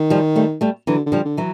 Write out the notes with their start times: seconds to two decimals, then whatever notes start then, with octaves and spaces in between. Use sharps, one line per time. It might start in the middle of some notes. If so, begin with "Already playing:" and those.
Already playing: D#3
0.10 F3 G3
0.36 G3 A3
0.61 G3 A3
0.87 D3 E3 F#3
1.06 D3
1.12 F3 G3
1.25 D3
1.37 E3 F#3